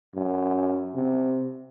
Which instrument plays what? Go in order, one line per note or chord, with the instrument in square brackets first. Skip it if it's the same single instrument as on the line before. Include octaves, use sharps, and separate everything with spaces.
[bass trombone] F#2
C3